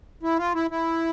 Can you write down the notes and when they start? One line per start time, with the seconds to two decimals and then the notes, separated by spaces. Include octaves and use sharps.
0.23 E4
0.39 F4
0.55 E4
0.71 E4